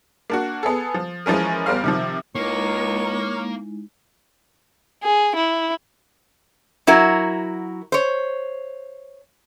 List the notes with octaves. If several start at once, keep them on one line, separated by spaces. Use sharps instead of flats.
A#3 D4 F#4
B3 G#4 A4
F3
E3 F3 G#3 C#4 A#4
E2 G3 A#4 C5 F5 F6
C3 D#3 F3
C#2 G#3 A#3 D#4 E4 C#5
G#4
E4
F#3 E4 F#4 A#4
C5 C#5